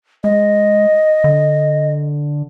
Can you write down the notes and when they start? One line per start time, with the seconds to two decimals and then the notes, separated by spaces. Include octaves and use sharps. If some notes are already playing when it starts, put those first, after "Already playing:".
0.24 G#3 D#5
1.24 D3